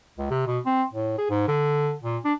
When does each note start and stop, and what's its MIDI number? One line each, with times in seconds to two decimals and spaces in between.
0.18 0.28 37
0.31 0.46 48
0.47 0.59 47
0.66 0.84 60
0.94 1.14 45
1.18 1.26 68
1.30 1.48 44
1.48 1.94 50
2.03 2.18 46
2.24 2.33 62